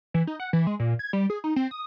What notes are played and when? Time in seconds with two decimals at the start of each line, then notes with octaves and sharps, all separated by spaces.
0.14 E3
0.27 D#4
0.40 F#5
0.53 E3
0.67 G#3
0.79 A#2
0.99 G#6
1.13 G3
1.30 G#4
1.44 D#4
1.56 C4
1.71 D#6